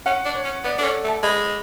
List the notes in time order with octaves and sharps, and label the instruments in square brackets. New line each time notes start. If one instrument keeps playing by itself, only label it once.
[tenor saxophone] C#4 [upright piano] F#5
[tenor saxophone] D4
[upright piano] C#5
[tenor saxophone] C#4
[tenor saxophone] B3 [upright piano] D5
[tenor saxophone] D4 [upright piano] A4
[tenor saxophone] C#4
A3
[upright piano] A5
[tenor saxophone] G#3 [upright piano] B5